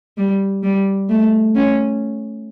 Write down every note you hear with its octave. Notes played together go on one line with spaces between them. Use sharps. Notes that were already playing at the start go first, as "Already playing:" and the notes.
G3
G3
A3
C#4